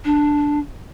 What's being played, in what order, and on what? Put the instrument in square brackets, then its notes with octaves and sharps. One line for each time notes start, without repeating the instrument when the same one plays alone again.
[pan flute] D4